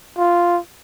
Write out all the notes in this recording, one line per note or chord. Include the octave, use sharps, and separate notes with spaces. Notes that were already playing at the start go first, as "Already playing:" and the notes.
F4